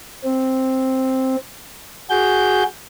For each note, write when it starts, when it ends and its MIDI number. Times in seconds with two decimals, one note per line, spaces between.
0.24 1.36 60
2.10 2.63 66
2.10 2.63 68
2.10 2.63 91